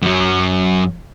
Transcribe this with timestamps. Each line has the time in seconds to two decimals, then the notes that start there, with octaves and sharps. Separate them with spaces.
0.02 F#2 F#3